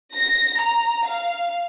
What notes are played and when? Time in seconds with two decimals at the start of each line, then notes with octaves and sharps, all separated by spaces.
0.15 A#6
0.60 A#5
1.06 F5